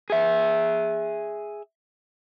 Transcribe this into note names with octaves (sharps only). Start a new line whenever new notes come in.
G#4 E5